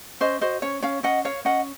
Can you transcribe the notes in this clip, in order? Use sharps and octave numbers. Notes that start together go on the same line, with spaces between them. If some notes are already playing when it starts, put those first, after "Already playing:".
C#4 C5 D#5
F#4 C5 D#5
C#4 C#5
C#4 C#5 F5
C#4 D#5 F#5
A#4 C#5 F5
C#4 D#5 F#5